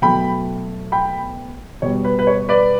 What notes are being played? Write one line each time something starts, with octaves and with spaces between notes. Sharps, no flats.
B2 F#3 A3 G5 B5
G5 B5
B2 G3 C#5
B4
B4
C#5
B4 D5